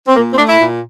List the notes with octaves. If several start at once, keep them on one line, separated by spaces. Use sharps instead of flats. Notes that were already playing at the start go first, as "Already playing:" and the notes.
C4
A#2 A#3
C4
A3 D4
E4
A#2